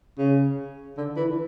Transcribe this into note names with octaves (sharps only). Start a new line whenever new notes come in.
C#3
D3
E3